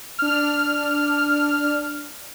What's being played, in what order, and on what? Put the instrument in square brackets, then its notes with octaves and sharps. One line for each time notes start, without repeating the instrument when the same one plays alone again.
[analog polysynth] D4 F6